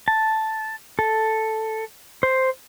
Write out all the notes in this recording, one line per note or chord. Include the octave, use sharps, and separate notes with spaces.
A5
A4
C5